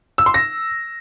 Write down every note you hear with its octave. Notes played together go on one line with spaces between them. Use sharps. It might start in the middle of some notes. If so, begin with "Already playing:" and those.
E6
C6
A#6